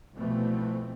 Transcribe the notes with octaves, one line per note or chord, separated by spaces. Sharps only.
C2 B2 E3 F3 A3 C4